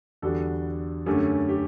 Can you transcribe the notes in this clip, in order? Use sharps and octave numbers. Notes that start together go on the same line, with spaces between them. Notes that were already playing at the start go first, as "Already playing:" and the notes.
E2 D3 G3 D4 F#4 A4
F#2 D3 A3 C#4 G4
G4